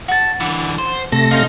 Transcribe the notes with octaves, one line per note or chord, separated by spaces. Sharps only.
F#4 A5
D3 E3 F#5
C5
C3 A3 A4 A#6
C#4 D#4 C5 F5